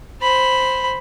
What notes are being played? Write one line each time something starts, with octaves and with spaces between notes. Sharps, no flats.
C5 B5